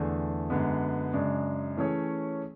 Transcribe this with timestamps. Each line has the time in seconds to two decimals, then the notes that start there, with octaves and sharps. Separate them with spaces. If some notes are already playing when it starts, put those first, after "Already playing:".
Already playing: E2 D3 A3 D4 G#4
0.50 F#2 D3 G#3 B3
1.13 F#2 C#3 G#3 D4
1.77 E3 A3 C#4 G#4 C#5